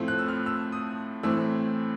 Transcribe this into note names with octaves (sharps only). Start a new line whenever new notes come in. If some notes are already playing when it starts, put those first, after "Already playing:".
Already playing: A2 F3 A3 C4
F#6
E6
F6
E6
D#6
A2 E3 A3 C4 E6